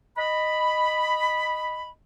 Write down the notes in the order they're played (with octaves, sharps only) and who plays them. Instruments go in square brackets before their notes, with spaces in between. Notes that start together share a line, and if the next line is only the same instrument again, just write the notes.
[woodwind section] D#5 B5